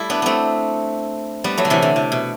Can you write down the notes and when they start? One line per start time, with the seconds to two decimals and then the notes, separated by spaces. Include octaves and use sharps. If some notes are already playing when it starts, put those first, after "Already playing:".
Already playing: G3 A3 E4
0.10 B3 D4
0.22 A3 B3 C4
1.44 G3 B3
1.57 F#3 A3
1.65 D3
1.70 C3 E3
1.82 D3
1.96 C3
2.12 B2